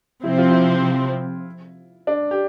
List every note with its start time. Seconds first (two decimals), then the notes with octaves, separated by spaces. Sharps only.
0.23 C3 F3 C4 E4
0.38 F4
0.51 E4
2.07 D4
2.31 G4